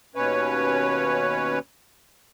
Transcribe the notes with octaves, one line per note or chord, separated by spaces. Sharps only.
D#2 B2 C#4 B4 C#5